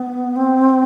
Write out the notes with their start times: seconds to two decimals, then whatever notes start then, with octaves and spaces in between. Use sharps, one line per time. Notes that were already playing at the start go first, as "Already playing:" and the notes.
Already playing: B3
0.36 C4